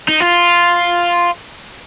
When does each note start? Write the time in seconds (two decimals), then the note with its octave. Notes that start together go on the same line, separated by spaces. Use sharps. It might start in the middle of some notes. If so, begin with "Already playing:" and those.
0.08 D#4
0.20 F4